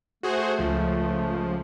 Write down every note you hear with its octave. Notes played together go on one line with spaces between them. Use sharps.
A3 F#4 G#4 C5
C#2 F3